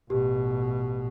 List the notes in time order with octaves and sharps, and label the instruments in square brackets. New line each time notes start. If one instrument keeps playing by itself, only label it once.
[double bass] A1 B2 [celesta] G4